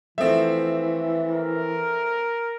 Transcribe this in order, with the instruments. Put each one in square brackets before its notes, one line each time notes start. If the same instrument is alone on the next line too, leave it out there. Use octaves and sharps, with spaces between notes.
[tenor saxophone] E3 [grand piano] F3 A3 C4 [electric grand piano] E5
[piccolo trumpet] A#4